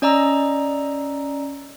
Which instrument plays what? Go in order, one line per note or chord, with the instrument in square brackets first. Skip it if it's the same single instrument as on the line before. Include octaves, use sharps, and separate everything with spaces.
[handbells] C#4 D5 D#5 A#5 E6